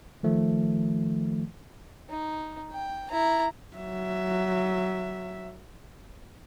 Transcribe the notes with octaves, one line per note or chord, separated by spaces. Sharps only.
D#3 F3 A3
D#4
G5
E4 A#5
F#3 E5